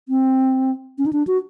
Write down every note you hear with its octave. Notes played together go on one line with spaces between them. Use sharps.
C4
C#4
D#4
D4
F#4